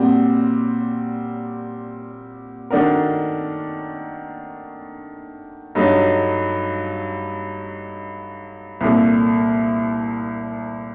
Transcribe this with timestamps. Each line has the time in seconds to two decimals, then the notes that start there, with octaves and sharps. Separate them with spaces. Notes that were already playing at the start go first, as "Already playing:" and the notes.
Already playing: A#2 G3 C4 F#4
2.71 D#3 A3 D4 F#4 A#4
5.75 G2 F#3 A3 D#4
8.81 C2 A#2 A3